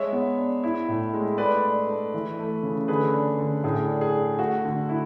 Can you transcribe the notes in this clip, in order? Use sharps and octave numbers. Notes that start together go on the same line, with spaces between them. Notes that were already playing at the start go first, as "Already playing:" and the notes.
Already playing: G#3 C#5 E5
B3
D4
E4
A2
G#3
A3 B4 D5
D4
A3
E3
A3
C#3
D3 G#4 B4
D4
D3
A2 G#4
D4
G#4
D4
A3 F#4
D3
E4